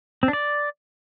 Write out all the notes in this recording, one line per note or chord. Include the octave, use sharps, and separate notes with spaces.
C4
D4
D5